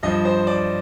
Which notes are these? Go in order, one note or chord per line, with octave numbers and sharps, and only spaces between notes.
G2 F3 D#5
C5
D5